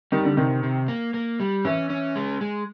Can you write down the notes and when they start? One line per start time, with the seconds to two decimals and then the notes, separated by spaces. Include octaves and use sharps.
0.12 D#3 G3
0.25 D3
0.37 C3 D#3
0.63 C3
0.88 A#3
1.14 A#3
1.40 G3
1.65 E3 C#4
1.90 C#4
2.16 G#3
2.41 G#3